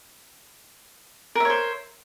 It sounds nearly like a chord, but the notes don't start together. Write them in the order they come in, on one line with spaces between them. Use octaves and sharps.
A#4 E5 C#5 C5